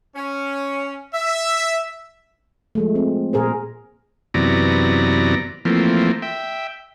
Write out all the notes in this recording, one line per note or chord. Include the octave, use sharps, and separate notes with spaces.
C#4
E5
F3 G#3 A3
C4
A#2 G#4 A#4 C5
F#2 C3 E3 B3 D5 A#5
E3 F3 A3 A#3 C4
E5 G5